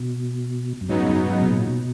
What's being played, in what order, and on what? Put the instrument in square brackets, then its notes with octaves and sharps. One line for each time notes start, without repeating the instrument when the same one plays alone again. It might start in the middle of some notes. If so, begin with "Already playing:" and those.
Already playing: [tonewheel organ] B2
F#2
[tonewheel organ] G#2 [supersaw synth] C#3 F#3 B3 D#4
[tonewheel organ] G#2
F#2
G#2
B2
A#2
B2